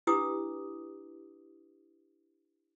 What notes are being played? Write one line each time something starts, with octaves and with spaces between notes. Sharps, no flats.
D4 E4 G4 B4 D6 D#6